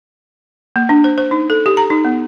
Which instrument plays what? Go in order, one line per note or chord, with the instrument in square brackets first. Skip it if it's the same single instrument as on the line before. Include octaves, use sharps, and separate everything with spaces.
[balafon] A#3
D4
C5
C5
D#4
A4
G4
A#5
D#4
B3